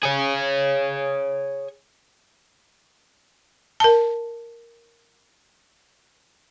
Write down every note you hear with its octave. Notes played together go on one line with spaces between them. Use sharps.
G#4 C#5
A#4 A5